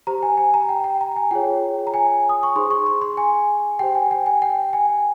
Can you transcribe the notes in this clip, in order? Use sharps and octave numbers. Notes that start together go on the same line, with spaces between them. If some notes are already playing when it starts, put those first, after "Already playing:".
G4 C5 A#5
G#5
G#5
A#5
G5
G5
A#5
G#5
F4 G#4 C#5 G5
A#5
G#5
D#6
C#6
D#4 G#4 C5 C6
C#6
C6
C6
G#5
G4 C5 G5
G#5
G5
G#5
G5
G#5